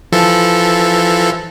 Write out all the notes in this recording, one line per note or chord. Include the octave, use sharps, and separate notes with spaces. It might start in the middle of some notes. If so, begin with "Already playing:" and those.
E3 F3 A4